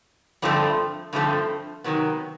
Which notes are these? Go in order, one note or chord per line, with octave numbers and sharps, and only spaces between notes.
G2 D3 F3 A3 C4
G2 D3 F3 A3 C4
C3 D#3 F#3 B3